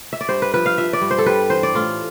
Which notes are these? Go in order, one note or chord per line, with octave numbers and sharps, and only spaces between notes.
E5
D5
G2 C5
B4
F3 B4
F5
F3 E5
D5
G2
C5
A4
G3 B4
E3 C5
D5
A2 F4